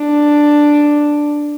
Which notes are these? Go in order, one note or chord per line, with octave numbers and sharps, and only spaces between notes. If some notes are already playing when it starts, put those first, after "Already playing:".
Already playing: D4